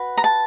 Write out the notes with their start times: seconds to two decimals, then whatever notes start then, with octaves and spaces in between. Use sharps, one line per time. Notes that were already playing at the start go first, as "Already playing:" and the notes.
Already playing: F#4 B4
0.17 A#5
0.24 A5